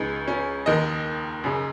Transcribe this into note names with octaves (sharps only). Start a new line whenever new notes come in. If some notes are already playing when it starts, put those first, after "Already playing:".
Already playing: C#2 C#3 D#4
C#4
D#2 D#3 D#5
F#2 C#3